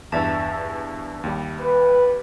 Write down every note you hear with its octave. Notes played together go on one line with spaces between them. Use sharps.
E2 G2 D5 E5 A5
D#2 G3
B4